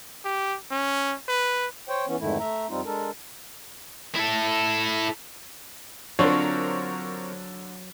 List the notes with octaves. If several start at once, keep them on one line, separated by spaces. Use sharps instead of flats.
G4
C#4
B4
C5 C#5 G5
E3 B3 C#4
F2 G#2 D3 D#3 A3 E4
A3 E5 A#5
F2 G3 C4 D#4 F4
G#3 D4 A4 A#4
E4 A4
D3 F#3 C4 D4 F4 A#4 C5 C#5